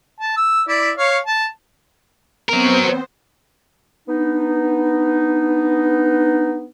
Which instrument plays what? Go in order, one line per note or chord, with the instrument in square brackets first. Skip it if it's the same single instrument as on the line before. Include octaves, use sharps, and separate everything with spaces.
[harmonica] A5
E6
E4 D5 E5
C#5 F5 C#6
A5
[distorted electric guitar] F#3 A#4 [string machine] B3 C4 C5
[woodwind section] B3 D4 D#4